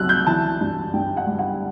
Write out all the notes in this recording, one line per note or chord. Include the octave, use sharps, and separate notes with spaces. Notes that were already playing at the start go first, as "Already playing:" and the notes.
Already playing: C2 C3 F#3 E6 F#6
G6
E3 A5
G2
G2 G5
F#5
G3
F#5